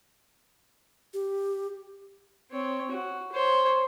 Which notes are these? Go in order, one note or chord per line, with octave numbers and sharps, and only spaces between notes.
G4
C4 C#5
F#4
C5 C#5